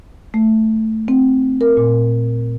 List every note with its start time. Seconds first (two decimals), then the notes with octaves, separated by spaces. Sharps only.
0.34 A3
1.08 C4
1.61 A#4
1.77 A#2